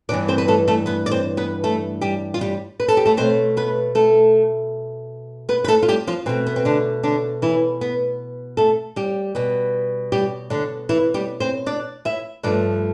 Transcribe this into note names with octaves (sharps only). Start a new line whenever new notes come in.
G2 E3 B3 D4 D5
C4 C5
B4
A3 A4
A3 A4
B3 B4
D5
C4 C5
B3 B4
A3 A4
G3 G4
F4
G3 G4
B4
A4
G4
A3 A4
B2 A3 C4 C5
B3 B4
A3 A4
B3 B4
B4
A3 A4
F4
G3 G4
F3 F4
B2 A3 C4
B3
C4
D3 D4
D3 D4
E3 E4
B3
A3 A4
G3 G4
B2 G3 B3
G3 G4
D3 D4
E3 E4
G3 G4
C4 C5
D4 D5
E4 E5
G2 F3 A3 D4 D5